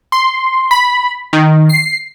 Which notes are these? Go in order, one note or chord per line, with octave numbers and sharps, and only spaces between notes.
C6
B5
D#3
C7